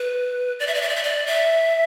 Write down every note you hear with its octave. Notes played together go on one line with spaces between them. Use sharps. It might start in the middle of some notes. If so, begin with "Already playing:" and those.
Already playing: B4
D5
E5
D5
E5
D5
E5
D5
E5